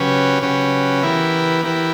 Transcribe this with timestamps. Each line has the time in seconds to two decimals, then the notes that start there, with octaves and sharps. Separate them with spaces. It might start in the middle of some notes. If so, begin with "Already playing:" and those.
Already playing: C#3 F#3 C#4 G4 B4
0.42 C#3 F#3 C#4 G4 B4
1.03 E3 B3 E4 G4 A#4
1.64 E3 B3 E4 G4 A#4